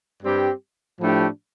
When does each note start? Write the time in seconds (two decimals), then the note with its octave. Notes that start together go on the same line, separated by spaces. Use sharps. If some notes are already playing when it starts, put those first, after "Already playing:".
0.23 G2 G3 C4 G4
1.01 A2 F3 A3 D4 G4